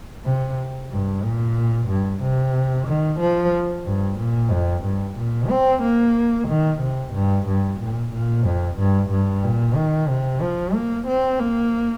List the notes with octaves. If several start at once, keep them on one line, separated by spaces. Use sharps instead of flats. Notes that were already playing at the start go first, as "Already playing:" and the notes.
C3
G2
A#2
G2
C3
D#3
F3
G2
A#2
F2
G2
A#2
C4
A#3
D#3
C3
G2
G2
A#2
A#2
F2
G2
G2
A#2
D#3
C3
F3
A#3
C4
A#3